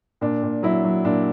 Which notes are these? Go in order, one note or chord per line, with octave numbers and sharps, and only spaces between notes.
A#2 D4
A#2
F#3 E4
F#3
A#2 D4